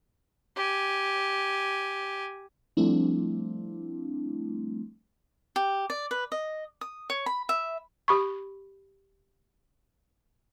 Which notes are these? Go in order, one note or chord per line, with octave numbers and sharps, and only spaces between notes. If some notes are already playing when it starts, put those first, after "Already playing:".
G4 G#5
F3 G3 A3 C4 D4 E4
G4
D5
B4
D#5
D#6
C#5
B5
E5
G4 B5 C#6